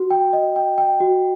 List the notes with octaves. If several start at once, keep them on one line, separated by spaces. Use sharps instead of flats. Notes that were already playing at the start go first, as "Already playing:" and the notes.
Already playing: F#4
G5
D#5
G5
G5
F#4